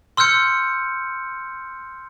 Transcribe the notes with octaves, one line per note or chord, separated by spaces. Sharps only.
C6 E6 F6 G6 C#7